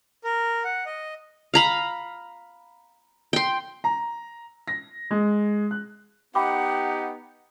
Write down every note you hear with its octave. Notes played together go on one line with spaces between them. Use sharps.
A#4
F#5
D#5
F5 A#5 B5
G5 C6
A#5
A#6
G#3
F#6
B3 D#4 G4 F#5 G5 B5 D6